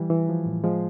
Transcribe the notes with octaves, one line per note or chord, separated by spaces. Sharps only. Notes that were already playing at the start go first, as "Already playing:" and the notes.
Already playing: E3 G3
E3
F3
A2
F3 G#3